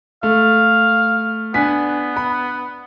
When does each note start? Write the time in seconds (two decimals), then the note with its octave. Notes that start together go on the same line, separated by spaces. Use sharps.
0.23 A3 F5
1.54 B3 D4 G#5 B6
2.17 B5